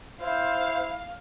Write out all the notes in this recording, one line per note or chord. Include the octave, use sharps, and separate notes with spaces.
E4 C5 F5